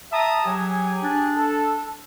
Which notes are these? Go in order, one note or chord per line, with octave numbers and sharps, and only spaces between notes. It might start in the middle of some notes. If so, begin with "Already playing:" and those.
E5 A5 A#5 D#6
F#3 G4 G#4 G#5
D4
A4